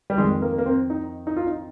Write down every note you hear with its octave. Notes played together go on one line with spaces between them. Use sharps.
G3
F2 D#3 G#3
A#3
A#3
C4
D#4
D#4
F4
D#4